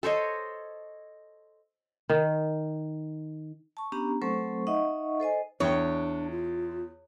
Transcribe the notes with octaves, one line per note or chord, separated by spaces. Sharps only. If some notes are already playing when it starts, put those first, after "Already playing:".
A4 C5 C#5 D#5
D#3
A5 C#6
B3 C#4 D4 G4 A#5
F#3 A3 C4 A4 C5 C#6
D#4 D#5 E5 F#5 C#6
A4 C5 D#5 G#5
E2 D4 C#5 G5
F4